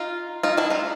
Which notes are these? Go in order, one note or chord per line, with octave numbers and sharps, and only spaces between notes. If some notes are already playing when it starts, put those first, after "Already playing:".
Already playing: D#4 F4
D#4 F4
D4 E4
D#4 F4